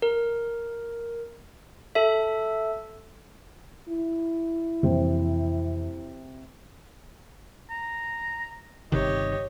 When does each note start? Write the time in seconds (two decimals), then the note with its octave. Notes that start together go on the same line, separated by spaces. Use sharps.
0.02 A#4
1.95 A4 E5
3.89 E4
4.83 F2 C3 E3 A#3
7.70 A#5
8.92 G1 C3 D#3 G4 C#5 D#5